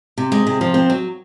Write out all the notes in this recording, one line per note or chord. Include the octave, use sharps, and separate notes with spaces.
C3
G#3
C3
F3
C4
F#3